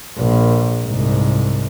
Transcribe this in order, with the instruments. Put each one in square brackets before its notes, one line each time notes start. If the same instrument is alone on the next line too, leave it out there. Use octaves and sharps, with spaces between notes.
[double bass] A#1
C2 G#2